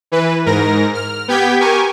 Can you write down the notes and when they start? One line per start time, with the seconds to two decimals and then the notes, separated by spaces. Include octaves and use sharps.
0.12 E3 B4
0.46 G#2 A#4 A#6
0.94 F6
1.28 B3 G4 G5 G#6 B6
1.60 G4 A#4 G#5 C#6